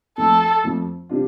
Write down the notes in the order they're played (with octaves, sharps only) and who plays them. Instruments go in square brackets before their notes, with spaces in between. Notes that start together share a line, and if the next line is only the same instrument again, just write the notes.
[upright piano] F2 F3 A3 [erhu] A4
[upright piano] F2 F3 A3
C3 G3 D4 F4